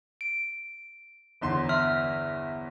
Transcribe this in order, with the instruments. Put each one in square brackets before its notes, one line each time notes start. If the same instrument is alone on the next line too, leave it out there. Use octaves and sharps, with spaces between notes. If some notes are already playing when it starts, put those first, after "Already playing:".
[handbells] D7
[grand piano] G1 E2 C6
[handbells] E5 F6